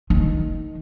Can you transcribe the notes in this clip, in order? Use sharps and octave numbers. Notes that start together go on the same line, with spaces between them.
D#3